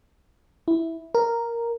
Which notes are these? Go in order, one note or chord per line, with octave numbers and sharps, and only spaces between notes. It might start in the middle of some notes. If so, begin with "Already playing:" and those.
E4
A#4